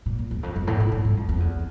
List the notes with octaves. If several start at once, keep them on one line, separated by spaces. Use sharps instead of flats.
A#2
E2
E2
F2
F2
A2
A2
A2
G#2
F2
F2
E2